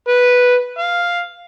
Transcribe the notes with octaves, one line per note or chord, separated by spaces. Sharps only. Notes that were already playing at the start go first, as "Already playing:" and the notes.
B4
F5